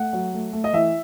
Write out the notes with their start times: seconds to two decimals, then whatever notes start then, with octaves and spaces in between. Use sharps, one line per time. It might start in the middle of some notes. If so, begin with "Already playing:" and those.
Already playing: A3 F#5
0.13 F#3
0.34 A3
0.53 A3
0.64 D#5
0.73 E3 E5